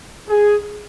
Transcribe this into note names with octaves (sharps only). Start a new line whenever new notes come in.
G#4